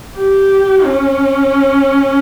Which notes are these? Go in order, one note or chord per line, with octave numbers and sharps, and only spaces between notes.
G4
C#4